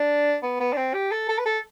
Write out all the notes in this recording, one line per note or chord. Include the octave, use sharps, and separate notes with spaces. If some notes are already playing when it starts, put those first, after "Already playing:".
Already playing: D4
B3
B3
D4
C4
G4
A4
A4
B4
A4